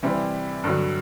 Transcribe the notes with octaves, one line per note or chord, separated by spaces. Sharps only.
C3 E3 G3 C4
G2 D3 F#3